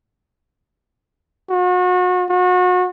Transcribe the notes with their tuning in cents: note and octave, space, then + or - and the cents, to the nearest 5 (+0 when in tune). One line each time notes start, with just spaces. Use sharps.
F#4 -35
F#4 -35